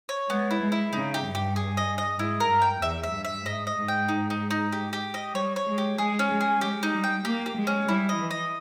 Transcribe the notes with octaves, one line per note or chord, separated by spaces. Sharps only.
C#5
G#3 B3
E4
G#3
E4
C#3 D#4
G4
G2
G4
G#4
D#5
D#5
G#2 E4
A#4
G2
G5
E2 E5
E5
G2
E5
G#2 D#5
D#5
G#2
G5
D#4
D#4
D#4
G4
G4
D#5
G3 C#5
C#5
G#3
G4
G#3 G#4
C#4
G#3
G#4
G#3 G4
D#4
G3
G5
A#3 G4
G4
G#3
C#4
G3 E4
D#5
E3
D#5